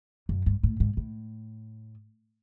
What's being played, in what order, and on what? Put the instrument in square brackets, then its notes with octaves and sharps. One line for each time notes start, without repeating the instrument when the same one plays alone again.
[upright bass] F#2
G2
A2
G#2
A2